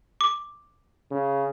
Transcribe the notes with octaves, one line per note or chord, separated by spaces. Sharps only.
D6
C#3